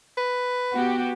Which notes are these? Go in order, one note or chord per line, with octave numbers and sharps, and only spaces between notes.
B4
B3 F#4 G4